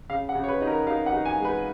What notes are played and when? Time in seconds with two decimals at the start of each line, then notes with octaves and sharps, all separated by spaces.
0.10 C#3 F5
0.29 F#5
0.35 C#3
0.44 C#5
0.48 B4
0.61 D#4
0.67 A#4
0.87 D#4 F5
1.06 F#5
1.13 D#4
1.25 G#5
1.38 G#3
1.45 B4